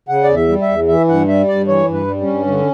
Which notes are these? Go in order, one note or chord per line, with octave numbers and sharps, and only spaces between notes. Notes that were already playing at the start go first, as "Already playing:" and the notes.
C#3 F#5
D5
E2
E5
G3
E5
E2
E3 E5
G2 F#5
G3 E5
G2 D5
E3 C#5
G2
B4
G3
C#4
G2
D3